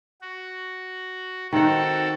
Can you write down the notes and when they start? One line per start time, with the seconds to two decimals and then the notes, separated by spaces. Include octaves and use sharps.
0.21 F#4
1.53 D#3 C4 F#4 A4 F#5